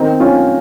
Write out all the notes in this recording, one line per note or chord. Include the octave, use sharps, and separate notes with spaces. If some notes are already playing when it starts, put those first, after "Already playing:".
Already playing: D#3 C4 D#4
C#4 F4